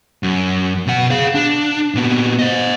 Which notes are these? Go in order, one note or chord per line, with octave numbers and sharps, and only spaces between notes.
F#2
B2 F#5
G#4 F5
D4
A#2 B3
C5 D#5